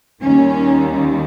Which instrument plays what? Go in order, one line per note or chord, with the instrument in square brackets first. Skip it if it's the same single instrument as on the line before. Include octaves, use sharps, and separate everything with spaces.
[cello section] D#2 D#3 G3 C#4